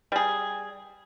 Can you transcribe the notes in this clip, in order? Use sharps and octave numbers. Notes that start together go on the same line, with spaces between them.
G3 G#4